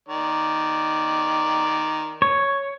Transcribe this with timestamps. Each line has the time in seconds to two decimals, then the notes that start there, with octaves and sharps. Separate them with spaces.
0.09 D#3 D5
2.22 C#5